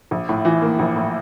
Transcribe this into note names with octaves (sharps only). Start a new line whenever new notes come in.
A#1
A2
E3
A#3
A#1
A2